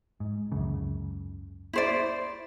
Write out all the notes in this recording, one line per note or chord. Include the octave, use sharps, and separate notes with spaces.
G#2
C#2 F#2 C#3
E4 C5 D5